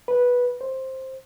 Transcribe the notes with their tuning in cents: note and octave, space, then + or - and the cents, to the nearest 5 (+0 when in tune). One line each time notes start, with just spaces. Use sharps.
B4 -10
C5 +10